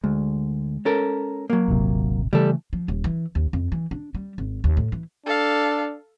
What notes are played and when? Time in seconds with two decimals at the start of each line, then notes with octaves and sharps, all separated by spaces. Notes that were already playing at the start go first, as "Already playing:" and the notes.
0.04 D2 G#3
0.85 C#4 A4 A#4
1.50 F#3 A#3
1.68 D#1 G#1 C3
2.33 C#3 E3 G3 A3 A4
2.73 F3
2.88 D#1
3.04 E3
3.35 D#2
3.53 F2
3.72 E3
3.91 D4
4.15 G3
4.38 G#1
4.64 D#2
4.77 A2
4.92 E3
5.26 D4 A4 F5